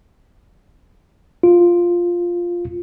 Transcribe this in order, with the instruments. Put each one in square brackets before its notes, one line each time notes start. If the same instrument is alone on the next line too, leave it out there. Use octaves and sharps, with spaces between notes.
[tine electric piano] F4